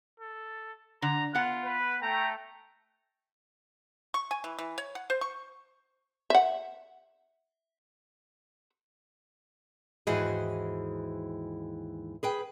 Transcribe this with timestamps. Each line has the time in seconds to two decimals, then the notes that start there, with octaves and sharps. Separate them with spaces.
0.20 A4
1.02 D3 A#5
1.35 B3 F4 F#5
1.65 B4
2.02 A3 G5 A#5
4.14 C#6
4.31 G#5
4.44 E3
4.59 E3
4.78 C#5
4.95 F#5
5.10 C5
5.21 C#6
6.30 E5 F#5
10.07 D#2 G#2 E3 F#4 G#4
12.23 G#4 B4 G5